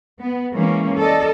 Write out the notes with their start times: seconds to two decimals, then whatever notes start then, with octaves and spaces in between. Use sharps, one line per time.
0.21 B3
0.53 E3 G#3 A#3 C#4
1.01 A4 D5 D#5